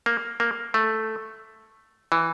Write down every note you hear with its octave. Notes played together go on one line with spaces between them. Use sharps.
A#3
A#3
A3
E3